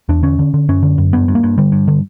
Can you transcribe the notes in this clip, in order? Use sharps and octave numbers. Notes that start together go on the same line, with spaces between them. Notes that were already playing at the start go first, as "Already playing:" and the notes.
E2 D4
D3 C#4
D3
D3
F#2 C#4
D3
F#2
G2 B3
G2
A#3
G2
D3 G3
G2
D3